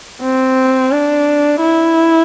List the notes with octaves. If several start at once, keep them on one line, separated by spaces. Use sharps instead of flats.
C4
D4
E4